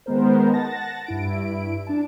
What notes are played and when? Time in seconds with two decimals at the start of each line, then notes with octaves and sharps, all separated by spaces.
0.06 D#3 G#3 B3 A#4 C5
0.53 F#5 A5 A6 A#6
1.06 G2 E4 D7
1.87 D4 A5